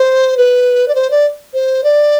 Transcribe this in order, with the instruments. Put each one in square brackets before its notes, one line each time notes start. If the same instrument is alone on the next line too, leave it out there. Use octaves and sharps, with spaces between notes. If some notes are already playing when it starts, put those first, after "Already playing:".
Already playing: [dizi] C5
B4
D5
C5
D5
C5
D5